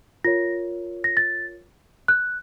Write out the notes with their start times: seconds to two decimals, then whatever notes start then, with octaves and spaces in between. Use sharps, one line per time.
0.24 F4 A#4 C#5 A#6
1.04 A#6
1.17 A6
2.08 F#6